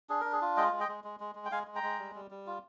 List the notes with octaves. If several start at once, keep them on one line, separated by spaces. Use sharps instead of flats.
D4 G#4
D4 A#4
G#4
F4
G#3 D#5 G5
G#3
D#5 G5
G#3
G#3
G#3
G#3
G5
G#3 F5 G#5
G#3
G5 A#5
G#3
G3
G3
G3
F4